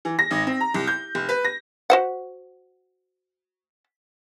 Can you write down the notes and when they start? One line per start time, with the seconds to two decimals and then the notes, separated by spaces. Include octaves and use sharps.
0.05 E3
0.19 A#6
0.31 G#1
0.47 C4
0.60 A#5
0.74 C2
0.87 G6
1.15 F1
1.29 B4
1.45 A#6
1.90 F#4 C5 F#5